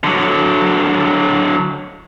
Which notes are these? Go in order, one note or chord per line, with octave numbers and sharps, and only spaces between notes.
D3 F#3